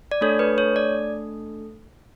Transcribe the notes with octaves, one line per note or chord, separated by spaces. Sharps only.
D5
A3 D4 A4 C#5
B4
C#5
D5